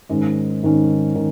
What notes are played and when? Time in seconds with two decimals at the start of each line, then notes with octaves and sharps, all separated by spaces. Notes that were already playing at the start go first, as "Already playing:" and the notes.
0.09 G#2 D#3 G#3 C#4
0.63 G#2 D#3 G#3 C#4
1.15 D#3